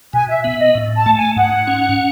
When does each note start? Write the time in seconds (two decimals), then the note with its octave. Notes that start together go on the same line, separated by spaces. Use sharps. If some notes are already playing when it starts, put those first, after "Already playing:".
0.13 B2 G#5
0.28 E5
0.44 B3 E5
0.59 D#5
0.75 A2
0.95 A5
1.06 A3
1.16 G#5
1.36 G#2 F#5
1.67 C#4